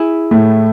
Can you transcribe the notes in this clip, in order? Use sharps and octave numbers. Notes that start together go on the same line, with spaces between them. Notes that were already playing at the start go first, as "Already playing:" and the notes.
Already playing: E4 G#4
A2 A3